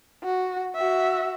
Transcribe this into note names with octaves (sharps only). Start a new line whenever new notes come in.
F#4
F#4 E5